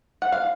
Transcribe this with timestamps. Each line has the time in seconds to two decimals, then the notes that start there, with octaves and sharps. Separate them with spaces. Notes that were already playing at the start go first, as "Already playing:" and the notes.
0.22 F#5
0.32 F5